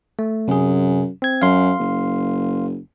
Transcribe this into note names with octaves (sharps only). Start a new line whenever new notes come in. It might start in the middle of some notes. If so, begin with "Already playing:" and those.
A3
F#2 C3 G#4
C4 G#6
F#2 F5 C6
F#1